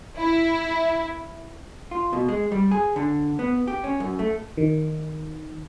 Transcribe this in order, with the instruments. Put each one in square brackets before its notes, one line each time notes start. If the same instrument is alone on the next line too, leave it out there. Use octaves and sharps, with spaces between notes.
[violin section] E4
[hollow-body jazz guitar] F4
B2
G#3
G3
G#4
D3
B3
G4
C#4
F#2
A3
[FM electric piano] D#3